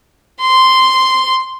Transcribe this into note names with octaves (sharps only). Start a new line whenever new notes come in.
C6